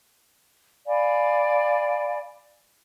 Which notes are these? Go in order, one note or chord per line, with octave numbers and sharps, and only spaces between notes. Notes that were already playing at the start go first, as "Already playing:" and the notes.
D5 F5 G#5 B5